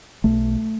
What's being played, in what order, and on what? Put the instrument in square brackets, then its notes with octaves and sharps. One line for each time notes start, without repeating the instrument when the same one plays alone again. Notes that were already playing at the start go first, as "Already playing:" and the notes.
[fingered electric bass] B1 A3